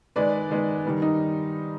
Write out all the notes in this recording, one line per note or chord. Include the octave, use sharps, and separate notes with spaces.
D#3 G#3 B3 B4 D5
D#3 G#3 B3
D#3 G3 B3
D#4